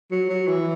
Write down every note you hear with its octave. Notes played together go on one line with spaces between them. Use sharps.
F#3
F#3
E3